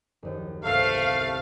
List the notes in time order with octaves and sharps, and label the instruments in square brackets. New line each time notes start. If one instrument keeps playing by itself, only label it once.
[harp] F#1 D#2
[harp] G1 C2 [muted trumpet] A3 [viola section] F5